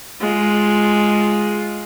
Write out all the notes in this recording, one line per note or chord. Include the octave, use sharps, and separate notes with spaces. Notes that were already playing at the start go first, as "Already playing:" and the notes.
G#3 F4